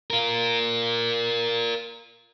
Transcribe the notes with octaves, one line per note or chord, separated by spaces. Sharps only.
F4 A#4